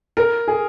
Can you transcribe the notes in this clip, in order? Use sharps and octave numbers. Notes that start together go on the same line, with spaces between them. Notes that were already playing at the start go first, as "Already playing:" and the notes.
A#4
G#4